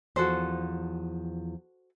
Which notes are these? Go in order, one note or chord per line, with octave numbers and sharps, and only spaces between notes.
E2 F3 F#4 A4 C5